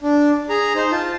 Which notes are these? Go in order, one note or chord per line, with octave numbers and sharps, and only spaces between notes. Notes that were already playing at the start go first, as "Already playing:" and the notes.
D4
G#4 A#5
D#4 C5
F4 A5